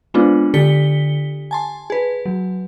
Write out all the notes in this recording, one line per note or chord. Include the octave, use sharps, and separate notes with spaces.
G#3 B3 C4 D4 F4
D3 G4 A4 B6 C#7 G7
G#5 A5 C6
G#4 B4
F#3